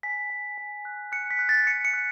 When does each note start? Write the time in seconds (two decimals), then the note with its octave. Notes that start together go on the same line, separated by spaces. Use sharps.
0.03 G#5 B6
0.30 G#5
0.58 G#5
0.85 F#6
1.12 F#6 C#7
1.31 B6
1.39 F#6
1.49 A6
1.67 F#6 C#7
1.85 C#7
1.94 F#6